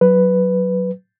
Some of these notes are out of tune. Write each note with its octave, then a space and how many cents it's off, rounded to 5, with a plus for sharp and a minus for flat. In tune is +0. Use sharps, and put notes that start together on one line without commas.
F#3 +0 B4 +5